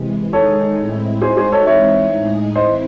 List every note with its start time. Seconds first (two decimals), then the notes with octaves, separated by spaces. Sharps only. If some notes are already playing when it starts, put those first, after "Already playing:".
Already playing: C3 E3 G#3
0.33 D#3 G#3 D#4 G#4 A4 C#5
0.78 A2 G#3 C4 E4
1.21 G#3 D#4 F#4 G#4 C5
1.37 G#4 C5
1.52 A4 C#5
1.66 E3 G#3 C4 D#4 C#5 E5
2.12 A2 G#3 D#4 G#4
2.55 E3 C4 E4 C5 D#5